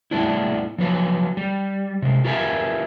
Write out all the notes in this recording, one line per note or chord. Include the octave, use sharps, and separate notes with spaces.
A2 G3 B3 D4 E4
F3 F#3 B4
G3
C3 G#3
F4 G4 A#4 B4 E5 G#5